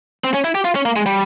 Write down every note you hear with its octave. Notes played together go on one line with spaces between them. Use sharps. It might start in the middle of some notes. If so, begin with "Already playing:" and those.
C4
C#4
E4
G4
F4
C#4
A#3
G#3
G3